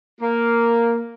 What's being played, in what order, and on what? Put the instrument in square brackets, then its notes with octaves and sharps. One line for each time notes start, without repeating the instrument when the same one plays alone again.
[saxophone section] A#3